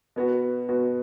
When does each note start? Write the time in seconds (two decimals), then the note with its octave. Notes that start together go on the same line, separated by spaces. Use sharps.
0.16 B2 B3 F#4
0.69 B2 B3 F#4